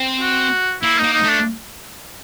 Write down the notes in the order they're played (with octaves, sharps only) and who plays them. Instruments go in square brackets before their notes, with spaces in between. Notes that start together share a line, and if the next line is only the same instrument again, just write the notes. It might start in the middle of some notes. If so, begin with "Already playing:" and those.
Already playing: [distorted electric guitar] C4
[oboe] F#4
[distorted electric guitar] A#3 [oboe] E4
[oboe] D#4
[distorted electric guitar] A#3
[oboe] D#4
[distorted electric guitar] A3
[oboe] D4